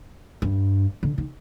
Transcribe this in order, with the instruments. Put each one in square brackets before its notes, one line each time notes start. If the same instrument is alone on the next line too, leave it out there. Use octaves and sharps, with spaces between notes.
[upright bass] G2
D3
D#3